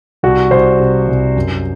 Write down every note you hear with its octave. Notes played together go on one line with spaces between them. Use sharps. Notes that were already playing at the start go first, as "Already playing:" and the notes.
C2 F#4
C2 C5
C3
C2
F#2